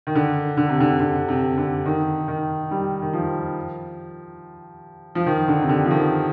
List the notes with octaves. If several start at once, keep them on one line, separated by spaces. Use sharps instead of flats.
D#3
D3
D3
C3
D3
D3
C3
D3
D#3
D#3
G3
D#3
F3
F3
D#3
D3
C3
D3
F3
D#3